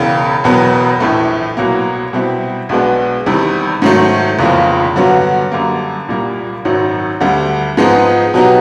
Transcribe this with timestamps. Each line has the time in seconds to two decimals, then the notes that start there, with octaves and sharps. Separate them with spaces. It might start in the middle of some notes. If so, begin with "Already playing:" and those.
Already playing: E1 E2 C#3
0.44 E1 E2 B2 F#3 B3
1.00 A#1 A2 E3 A3
1.57 C2 B2 F#3 A#3
2.13 B2 G3 C4 E4 G4
2.69 B1 B2 G#3 B3 D4
3.26 E2 C3 D#3 G3
3.82 G#2 D#3 F#3 A3
4.39 F1 E2 C#3 F3 A#3
4.96 G2 D3 F#3 B3
5.52 F#2 D3 G3 A#3
6.08 C2 A#2 G3 A#3
6.65 G#1 F#2 D#3 F#3
7.21 D2 D3 G3
7.77 G#2 F3 G#3 B3 D#4
8.34 B2 F#3 B3 D#4 G4